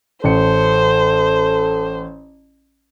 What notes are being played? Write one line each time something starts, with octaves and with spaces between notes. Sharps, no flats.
A1 A4 C5 C#7